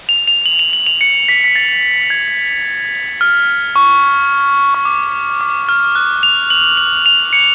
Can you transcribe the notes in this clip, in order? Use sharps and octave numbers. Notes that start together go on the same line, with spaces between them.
F7
F7
F#7
F7
F#7
F7
C#7
B6
B6
A6
G#6
F6
C#6
C#6
D6
D6
F6
F#6
F7
F#7
F#7
F7
C#7